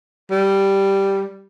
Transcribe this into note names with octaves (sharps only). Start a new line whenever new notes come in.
G3